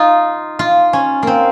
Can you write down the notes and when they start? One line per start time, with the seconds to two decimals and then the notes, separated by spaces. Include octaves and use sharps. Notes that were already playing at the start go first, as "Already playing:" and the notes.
Already playing: D#4 F4
0.59 F4
0.93 C#4
1.23 A#3 C4